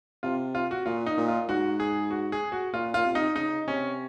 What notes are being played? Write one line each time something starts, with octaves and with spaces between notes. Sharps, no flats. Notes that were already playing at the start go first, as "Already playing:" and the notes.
C3 F4
F4
F#4
A#2 F4
D#4
A#2
F4
G#2 F#4
G#4
F#4
G#4
F#4
A#2 F4
A#2 F4
C3
D#4
C#3 D#4
C3 C#4